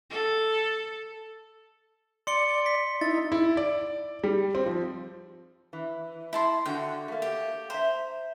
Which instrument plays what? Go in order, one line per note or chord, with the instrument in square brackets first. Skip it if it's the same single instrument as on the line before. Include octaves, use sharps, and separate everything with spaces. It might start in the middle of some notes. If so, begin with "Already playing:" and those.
[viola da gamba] A4
[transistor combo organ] D5 [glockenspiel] C6 C#7 G7
[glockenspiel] B6
[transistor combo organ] D#4 E4 [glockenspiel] A6
[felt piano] E4
D5
G3
C4
F3
[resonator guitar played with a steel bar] E3
[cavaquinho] E4 A5 C6
[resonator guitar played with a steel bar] D3 F#4 [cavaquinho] G5
[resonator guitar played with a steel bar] A3 A#3
[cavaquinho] G4
[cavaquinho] C5 [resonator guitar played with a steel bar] E5 A#5